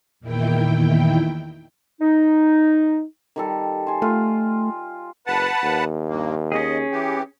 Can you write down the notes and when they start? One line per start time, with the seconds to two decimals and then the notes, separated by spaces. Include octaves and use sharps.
0.20 E2 A#2 D#3 E4 G5
2.01 D#4
3.36 D#3 G3 A4
3.87 C5 G#5
4.02 A3 F4
5.27 F#1 B4 F#5 A5
5.63 D#2
6.09 G2 A#3
6.52 C#4 G#4 D#5
6.92 E3 G4